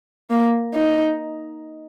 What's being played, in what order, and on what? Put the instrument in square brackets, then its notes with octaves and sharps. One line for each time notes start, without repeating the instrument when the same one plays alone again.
[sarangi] A#3
D#4